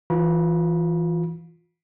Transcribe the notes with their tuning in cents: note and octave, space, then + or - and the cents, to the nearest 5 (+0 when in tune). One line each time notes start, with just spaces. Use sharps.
E3 +0 F4 +25 B5 -35